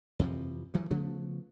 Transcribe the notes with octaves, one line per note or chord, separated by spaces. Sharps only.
F2 C3 E3 F3
G2 E3 F#3
C#3 F3 A3 B3